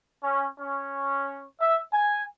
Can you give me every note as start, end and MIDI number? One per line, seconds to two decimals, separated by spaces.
0.23 0.45 61
0.60 1.44 61
1.61 1.80 76
1.92 2.23 80